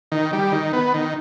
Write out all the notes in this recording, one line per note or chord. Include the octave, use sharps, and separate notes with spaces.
D#3
G3
D#3
B3
D#3